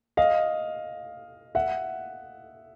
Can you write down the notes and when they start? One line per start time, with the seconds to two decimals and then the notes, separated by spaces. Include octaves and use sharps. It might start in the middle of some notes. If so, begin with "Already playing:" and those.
0.17 D#5 F5
1.55 E5 F#5